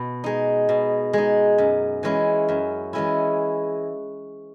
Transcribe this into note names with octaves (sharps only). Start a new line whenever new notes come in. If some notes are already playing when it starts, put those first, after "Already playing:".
Already playing: B2
G#3 D#4
B2
G#3 D#4
F#2
E3 G#3 C#4 E4
F#2
E3 G#3 C#4 E4